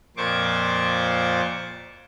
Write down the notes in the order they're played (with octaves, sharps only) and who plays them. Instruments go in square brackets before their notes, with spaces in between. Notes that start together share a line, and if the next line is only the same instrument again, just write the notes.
[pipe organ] F2 A#2 C5 C#6 D6